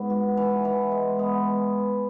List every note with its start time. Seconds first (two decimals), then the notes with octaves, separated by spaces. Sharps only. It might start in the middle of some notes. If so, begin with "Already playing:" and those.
Already playing: G#2 B3
0.10 F#4
0.37 E3
0.65 E3
0.91 G#3
1.19 B3